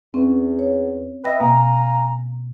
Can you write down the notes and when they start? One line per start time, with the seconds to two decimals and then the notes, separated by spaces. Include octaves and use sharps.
0.14 E2 C4 C#4
0.59 C#5
1.24 B4 D#5 E5 G5 A#6
1.40 B2 A#3 F5 G#5 A#5